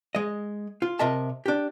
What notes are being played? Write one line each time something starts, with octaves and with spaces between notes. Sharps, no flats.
G#3 D#5
F4
C3 A#4 D#5 E5 A5
D4 G4